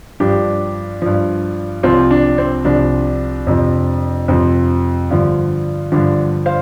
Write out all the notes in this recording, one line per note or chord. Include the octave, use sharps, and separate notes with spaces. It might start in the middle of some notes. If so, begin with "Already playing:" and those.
G2 F3 D4 G4
G2 F3
C2 C3 F3 C4 F4
D4
C4
C2 C3 F3 D4
F2 C3 F3
F2 C3 F3 C4
G2 D3 F3
G2 D3 F3 D4
C5 F5